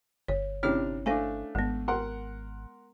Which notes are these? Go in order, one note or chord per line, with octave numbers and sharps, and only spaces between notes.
G1 C#5
C3 C#4 D4 E4 C#5 F6
A3 D4 C5 F5 G#5
G#1 G#3 B3
A#4 F#5 C6